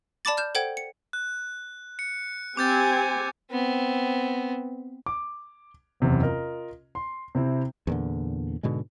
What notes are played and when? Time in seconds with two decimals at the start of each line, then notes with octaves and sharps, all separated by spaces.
0.25 D5 A5 B5 D6 A6
0.37 F6 G6 E7
0.55 A4 C5 F#5 G5 G#6 D7
0.77 C#7
1.13 F#6
1.99 C#7
2.57 C4 G4 G#5 D6 G6 A6
3.51 B3 C4
5.06 D6
6.00 F#1 E2 C3 B3
6.21 F4 A#4 D#5
6.95 C6
7.35 C3 C4 E4
7.87 E2 A#2 D3
8.63 G#2 B2 D3 G#3